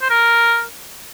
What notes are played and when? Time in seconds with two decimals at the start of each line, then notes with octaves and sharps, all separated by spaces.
0.02 C5
0.10 A#4